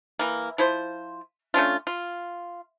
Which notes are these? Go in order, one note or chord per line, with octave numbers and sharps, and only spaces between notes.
E3 A#3
F3 E4 F4 C5
A3 C#4 D4 F4
F4